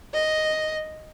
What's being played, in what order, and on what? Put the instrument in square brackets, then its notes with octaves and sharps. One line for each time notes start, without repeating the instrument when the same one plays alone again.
[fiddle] D#5